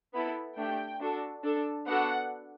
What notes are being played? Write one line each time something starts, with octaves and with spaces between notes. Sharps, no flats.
B3 E4 A4 B5
A3 D4 G4 G5
D4 F#4 A4
D4 A4
B3 D4 F#4 A4 F#5